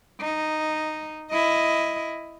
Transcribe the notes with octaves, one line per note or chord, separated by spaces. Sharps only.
D#4
E4 D#5